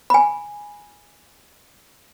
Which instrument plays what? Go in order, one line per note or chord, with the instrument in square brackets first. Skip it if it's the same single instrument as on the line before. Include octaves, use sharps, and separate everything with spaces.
[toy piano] G#5 B5